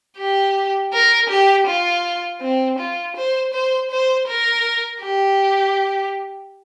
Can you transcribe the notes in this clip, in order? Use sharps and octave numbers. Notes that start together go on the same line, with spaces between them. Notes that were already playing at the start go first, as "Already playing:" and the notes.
G4
A#4
G4
F4
C4
F4
C5
C5
C5
A#4
G4